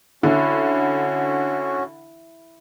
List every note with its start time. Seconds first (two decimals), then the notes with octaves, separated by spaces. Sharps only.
0.23 D3 C#4 E4 F#4